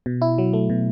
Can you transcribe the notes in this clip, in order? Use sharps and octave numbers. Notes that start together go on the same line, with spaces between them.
B2
E4
F#3
A3
B2